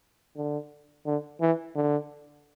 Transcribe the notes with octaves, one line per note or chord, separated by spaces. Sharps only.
D3
D3
E3
D3